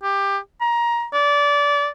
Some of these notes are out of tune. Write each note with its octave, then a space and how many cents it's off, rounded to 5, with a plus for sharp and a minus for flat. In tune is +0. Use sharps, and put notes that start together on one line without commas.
G4 +20
A#5 +20
D5 -25